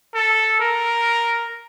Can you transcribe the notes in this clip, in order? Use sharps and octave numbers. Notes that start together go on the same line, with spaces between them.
A4
A#4